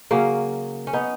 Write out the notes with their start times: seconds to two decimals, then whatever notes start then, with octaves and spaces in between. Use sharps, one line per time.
0.11 C#3 F#3 A#3 C#4
0.87 C#4
0.93 B3 D#4